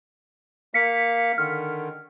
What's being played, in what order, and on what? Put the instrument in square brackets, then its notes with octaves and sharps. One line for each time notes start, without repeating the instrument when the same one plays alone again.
[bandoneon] A#3 F5 [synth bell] B6 C#7
[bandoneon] D3 D#3 [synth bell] F6